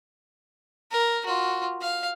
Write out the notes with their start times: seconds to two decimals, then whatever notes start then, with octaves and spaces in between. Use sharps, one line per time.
0.91 A#4
1.26 F4 F#4
1.81 F5